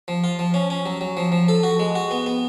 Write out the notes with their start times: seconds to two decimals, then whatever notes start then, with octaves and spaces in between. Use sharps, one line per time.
0.08 F3
0.24 F4
0.39 F3
0.54 C#4
0.70 C#4
0.86 F#3
1.01 F#3
1.17 F3
1.32 F3
1.48 A4
1.63 F#4
1.79 G#3
1.95 F#4
2.11 B3
2.26 B3